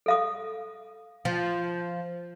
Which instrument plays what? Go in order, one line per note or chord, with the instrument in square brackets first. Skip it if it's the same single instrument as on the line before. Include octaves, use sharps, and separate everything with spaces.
[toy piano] A4 F5 D#6
[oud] F3